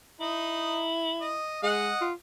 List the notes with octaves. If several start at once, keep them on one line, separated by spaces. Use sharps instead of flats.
D#4 E4
D#5
G#3 D#5 F#5
F4